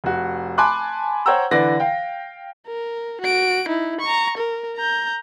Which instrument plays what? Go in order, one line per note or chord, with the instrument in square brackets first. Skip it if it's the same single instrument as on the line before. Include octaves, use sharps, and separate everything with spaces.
[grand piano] F1 F#4
G#5 A5 B5 C6 D6 F#6
C5 C#5 F#5 G5 A#5 E6
D3 E3 B4 D5 A#6
F5 G5
[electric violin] A#4
F#4 D7
D#4 E4
A#5 C#6
A#4
A#5 G6